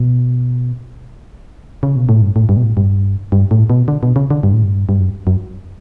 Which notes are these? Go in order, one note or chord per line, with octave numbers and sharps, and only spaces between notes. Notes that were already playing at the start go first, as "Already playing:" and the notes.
Already playing: B2
C#3
B2
A2
G2
A2
G2
B2
A2
G2
G2
A2
B2
D3
B2
C#3
D3
G2
A2
G2
G2
F#2
F#2